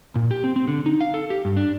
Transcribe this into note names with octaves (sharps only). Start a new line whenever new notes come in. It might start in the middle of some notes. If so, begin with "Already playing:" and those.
A#2
G4
C4
C4
D3
D#4
F5
A4
G4
G2
D4